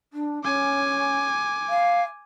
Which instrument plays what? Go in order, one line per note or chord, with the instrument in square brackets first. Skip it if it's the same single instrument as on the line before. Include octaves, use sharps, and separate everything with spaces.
[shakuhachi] D4
[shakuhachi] C#4 [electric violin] G#5 D6
[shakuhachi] F5